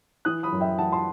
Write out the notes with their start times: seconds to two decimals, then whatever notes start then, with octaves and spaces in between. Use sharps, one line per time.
0.25 E3 D#6 F#6
0.43 B5 D#6
0.52 F#2
0.61 E5 G5
0.78 E3 F#5 A5
0.92 A5 C6